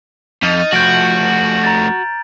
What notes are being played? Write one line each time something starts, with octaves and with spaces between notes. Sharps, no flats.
F2 D#4 D#5 F6 A6
F3 A3 F#4 G6 D7 F#7
A#5 A6